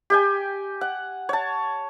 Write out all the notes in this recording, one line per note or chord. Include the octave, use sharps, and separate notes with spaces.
G4 G5 G#5
F#5
C#5 A5